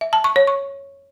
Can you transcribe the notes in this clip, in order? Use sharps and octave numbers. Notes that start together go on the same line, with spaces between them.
E5
A5
C#6
C#5
C#6